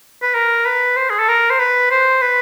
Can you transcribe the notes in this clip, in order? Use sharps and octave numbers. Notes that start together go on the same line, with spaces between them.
B4
A#4
B4
C5
G#4
A4
A#4
C5
B4
C5
B4